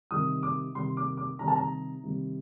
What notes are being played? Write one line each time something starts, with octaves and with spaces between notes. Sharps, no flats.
C3 D#3 G3 D#6
D6
C3 D#3 G3 C6
D6
D6
C3 D#3 G3 A#5
A5
A#5
C3 D#3 G3